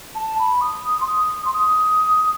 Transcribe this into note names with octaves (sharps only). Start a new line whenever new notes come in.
A5
B5
D#6
C6
D#6
C6
D#6